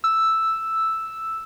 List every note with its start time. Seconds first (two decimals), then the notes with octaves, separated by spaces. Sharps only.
0.04 E6